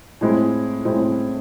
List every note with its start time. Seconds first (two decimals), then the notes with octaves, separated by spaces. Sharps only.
0.21 A2 G#3 C4 E4
0.85 A2 G#3 C4 E4